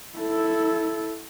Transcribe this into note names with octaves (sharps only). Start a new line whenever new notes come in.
E4 A4